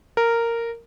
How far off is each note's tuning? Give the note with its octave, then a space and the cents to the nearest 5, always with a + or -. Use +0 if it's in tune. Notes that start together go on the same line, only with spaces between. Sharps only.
A#4 -10